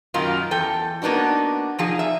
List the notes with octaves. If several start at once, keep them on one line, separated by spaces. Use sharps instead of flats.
F#2 B2 D#3 A#3 D#4 F4
E2 A4 G5
A#3 B3 D4 D#4 F#4
C3 F3 D#4 G#4
E5